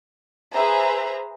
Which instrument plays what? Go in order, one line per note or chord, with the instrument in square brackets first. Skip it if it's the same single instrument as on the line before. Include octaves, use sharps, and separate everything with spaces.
[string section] G#4 B4 C5 E5 A#5